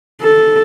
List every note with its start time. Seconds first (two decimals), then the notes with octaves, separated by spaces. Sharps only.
0.22 A4